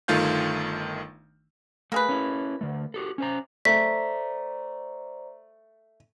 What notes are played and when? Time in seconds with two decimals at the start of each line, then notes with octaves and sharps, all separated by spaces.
0.08 G1 D#3 A3 F4 F5 G6
1.92 A3 A#3 G#4 B4
2.09 C#4 E4
2.61 D3 A3
2.94 F#4 G4 A4
3.18 C#4 C5 A#5
3.65 A3 C5 D5 A#5 B6